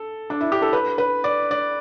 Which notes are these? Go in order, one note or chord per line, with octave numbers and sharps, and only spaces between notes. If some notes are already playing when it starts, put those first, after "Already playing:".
Already playing: A4
D4
E4
G4
A4
B4
B4
D5
D5